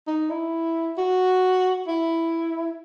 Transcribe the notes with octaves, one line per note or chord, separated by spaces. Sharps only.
D#4
E4
F#4
E4